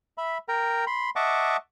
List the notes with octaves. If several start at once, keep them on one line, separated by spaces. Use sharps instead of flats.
E5 B5
A#4 G5 A#5
B5 C6
D#5 E5 F#5 A5 C#6 D6